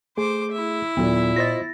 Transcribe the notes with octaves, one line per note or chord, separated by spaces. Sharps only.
A3 G#4 C5 D6
E4 E5
D#2 A#2 F#3 B3 A4
F4 C5 D#5 A6 A#6